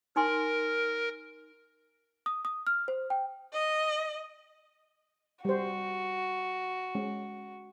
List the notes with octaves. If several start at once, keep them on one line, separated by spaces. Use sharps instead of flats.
D#4 A#4 G#5 C6
D#6
D#6
F6
C5
G5
D#5
G3 F#4 C5
G#3 C#4